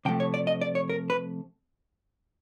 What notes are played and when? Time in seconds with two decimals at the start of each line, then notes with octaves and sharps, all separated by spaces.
0.05 C3 F3 A3 G5
0.20 C#5
0.34 D5
0.47 D#5
0.61 D5
0.75 C#5
0.89 A#4
1.10 B4